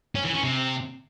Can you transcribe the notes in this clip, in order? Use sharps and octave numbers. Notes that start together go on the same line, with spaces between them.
C#4
E3
C#4
C3